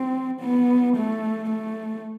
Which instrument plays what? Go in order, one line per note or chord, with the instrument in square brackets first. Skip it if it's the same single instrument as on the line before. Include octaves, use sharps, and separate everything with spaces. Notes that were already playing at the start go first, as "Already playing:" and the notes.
Already playing: [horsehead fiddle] C4
B3
A3
A3